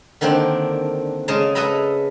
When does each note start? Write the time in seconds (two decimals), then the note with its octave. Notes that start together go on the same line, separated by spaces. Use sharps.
0.21 D3 D#3 A#3 C4 D4
1.28 C#3 G#3 G#4 A5 A#5
1.55 A4 B4 D#5 E5 A#5 B5